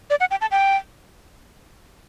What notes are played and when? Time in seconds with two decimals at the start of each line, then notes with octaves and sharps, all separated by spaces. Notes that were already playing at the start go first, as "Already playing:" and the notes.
0.10 D5
0.20 F#5
0.31 G5
0.41 A5
0.51 G5